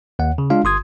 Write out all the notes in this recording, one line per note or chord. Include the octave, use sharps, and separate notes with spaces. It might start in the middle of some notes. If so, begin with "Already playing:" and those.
D#2 F#5
C#3
G#3 D4 F4 F5
G1 C6 D#6 G#6